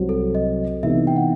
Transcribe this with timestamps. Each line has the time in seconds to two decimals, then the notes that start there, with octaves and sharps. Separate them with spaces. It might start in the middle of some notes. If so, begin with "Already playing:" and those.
Already playing: C2 C3 F#3 C4
0.09 A4
0.35 D#5
0.83 C3 E3 B3 D#4 E5
1.07 G5
1.16 F#5